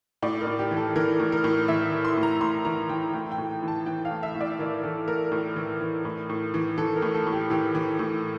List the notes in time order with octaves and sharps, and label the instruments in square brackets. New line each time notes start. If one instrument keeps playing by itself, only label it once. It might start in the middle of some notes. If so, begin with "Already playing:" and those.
[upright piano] A2 D5
A#4
A2
G4
E3
A4
E3 A#4
A2
A#4
A2
E3 E5
E3
C6
A2
A#5
A2 C6
E3 A#5
E3 G5
A2 G5
G5
A2
E3
A5
E3 G5
F5
A2
E5
A2
D5
E3 A#4
E3 A4
A2 A#4
A2
E3
E3
A2
A2
E3
E3 A4
A#4
A2
A4
A2
G4
E3 G4
E3
A2